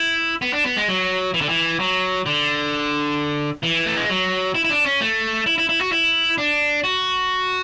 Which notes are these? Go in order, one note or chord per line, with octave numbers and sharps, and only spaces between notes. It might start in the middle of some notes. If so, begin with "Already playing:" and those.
Already playing: E4
B3
D4
B3
G#3
F#3
E3
D3
E3
F#3
D3
E3
A3
G#3
F#3
E4
E4
D4
C#4
A3
E4
E4
E4
F#4
E4
D4
F#4